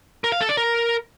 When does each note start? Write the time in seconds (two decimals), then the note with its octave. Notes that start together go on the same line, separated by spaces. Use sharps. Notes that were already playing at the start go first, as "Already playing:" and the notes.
0.24 A#4
0.32 F5
0.41 A4
0.49 D5
0.57 A#4